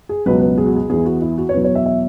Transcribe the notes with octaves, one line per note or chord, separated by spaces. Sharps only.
G#4
C#2 B2 F#3 B4
B4
G#4
F#4
G#4
E2 E3 G#4
F#4
E4
F#4
C#5
E2 B2 F#3 B4
C#5
E5
E5